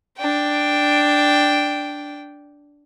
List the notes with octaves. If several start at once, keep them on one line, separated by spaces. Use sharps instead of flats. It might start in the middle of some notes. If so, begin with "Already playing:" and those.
D4 G5